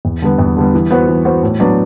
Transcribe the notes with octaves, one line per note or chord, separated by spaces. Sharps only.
E2
D3 G3 B3
E2
D3 G3 B3
E3
B3 F#4 C5
E3
B3 F#4 C5
A2
F#3 B3 D4